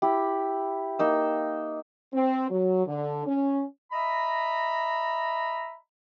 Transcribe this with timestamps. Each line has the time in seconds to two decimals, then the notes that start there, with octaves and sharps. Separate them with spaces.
0.02 E4 G4
0.99 A#3 D#4 E6
2.13 C4
2.50 F#3
2.87 D3
3.26 C#4
3.92 D#5 E5 A#5 B5